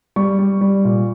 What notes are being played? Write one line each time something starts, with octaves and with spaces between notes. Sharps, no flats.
G3 C#6
G3
G3
A#2